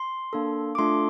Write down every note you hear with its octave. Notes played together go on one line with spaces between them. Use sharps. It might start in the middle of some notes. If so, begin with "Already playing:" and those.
Already playing: C6
A#3 D4 A4
D6
A3 D4 F4 A4 C6